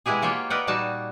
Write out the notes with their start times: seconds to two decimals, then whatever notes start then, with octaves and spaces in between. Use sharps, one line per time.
0.06 B2 G#3 E4 G4 G#4
0.22 A#3 F4 C#5 G5
0.50 A#4 B4 D5 D#5 F#5 G5
0.67 A#2 G3 D#4 F#4 A5